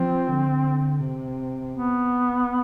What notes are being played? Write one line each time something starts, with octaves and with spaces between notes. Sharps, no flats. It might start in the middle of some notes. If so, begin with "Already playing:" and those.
Already playing: F3 C4
D3
C3
B3